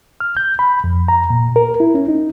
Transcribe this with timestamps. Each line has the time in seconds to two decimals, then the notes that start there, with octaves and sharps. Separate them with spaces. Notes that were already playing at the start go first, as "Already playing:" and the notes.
0.20 F6
0.37 G6
0.59 B5
0.84 F2
1.08 A#5
1.30 A#2
1.56 A#4
1.80 E4
1.95 C#4
2.08 D#4